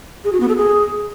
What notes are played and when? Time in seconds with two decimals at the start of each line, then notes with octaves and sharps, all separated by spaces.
0.24 G#4
0.32 F#4
0.40 B3
0.49 A4
0.57 G#4